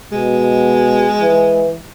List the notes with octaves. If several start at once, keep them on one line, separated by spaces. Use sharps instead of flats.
B2 G#3
E3